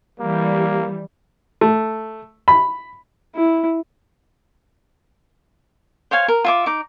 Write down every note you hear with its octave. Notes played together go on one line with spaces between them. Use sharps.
E3 G3 A#3
A3
B5
E4
C5 C#5 F5 G#5
A#4
F4 E5 D6
D#4 D6